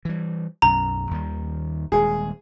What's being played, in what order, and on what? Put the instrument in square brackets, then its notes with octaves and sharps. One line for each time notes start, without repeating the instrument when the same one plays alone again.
[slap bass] E3 G3
[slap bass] B1 F#2 [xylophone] A#5
[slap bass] D#2 D#3 G3
[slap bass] D#1 G#3 [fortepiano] G#4